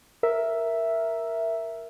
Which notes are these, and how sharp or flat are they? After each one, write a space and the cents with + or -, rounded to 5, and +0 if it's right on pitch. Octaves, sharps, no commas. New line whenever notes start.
A#4 +0 E5 +0